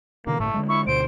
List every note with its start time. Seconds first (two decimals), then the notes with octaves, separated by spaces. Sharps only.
0.27 B2 D3 E3 A#3
0.40 G1 A2 A3
0.54 D3 E3 G#3
0.69 E4 C#6
0.87 D2 B2 D3 C5 D7